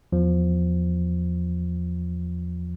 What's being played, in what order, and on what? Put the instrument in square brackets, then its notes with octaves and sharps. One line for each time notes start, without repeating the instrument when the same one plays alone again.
[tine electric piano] E2 F3